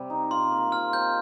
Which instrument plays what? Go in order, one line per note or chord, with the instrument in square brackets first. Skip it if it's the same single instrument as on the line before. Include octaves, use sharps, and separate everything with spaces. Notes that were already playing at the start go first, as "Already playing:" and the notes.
Already playing: [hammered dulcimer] C3 G3
D#4
[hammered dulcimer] F4 [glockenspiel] C6
[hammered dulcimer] A#3
[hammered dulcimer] F4 [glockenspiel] F6
[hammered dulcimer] C4 [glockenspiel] G6